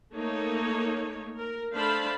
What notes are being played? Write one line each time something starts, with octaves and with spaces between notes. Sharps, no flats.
A3 A#3 D#4 C#5
A#4
A3 D4 C5 F5 A5 B5